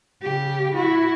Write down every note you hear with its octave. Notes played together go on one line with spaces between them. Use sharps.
C#3 G4
E4 F#4